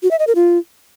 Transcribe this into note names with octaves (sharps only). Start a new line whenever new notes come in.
F#4
E5
D#5
A#4
F4